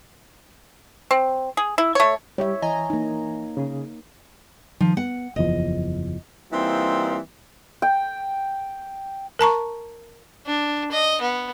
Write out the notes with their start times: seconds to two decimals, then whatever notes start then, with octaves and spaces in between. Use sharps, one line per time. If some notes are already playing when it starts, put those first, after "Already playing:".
1.11 C4
1.57 G#4
1.78 E4
1.95 A3 C#5
2.38 G3 G4 C#5 E5
2.62 E3 D#5 G#5 A#5
2.90 A#3 D#4
3.57 C#3 G#4
4.81 D#3 F3
4.97 B3 F#5
5.36 F#1 E2 F3 D#5
6.52 E3 G3 A#3 C4 D#4 F4
7.82 G5
9.39 A#4 A5 A#5 C#6
10.46 D4
10.92 D#5
11.21 B3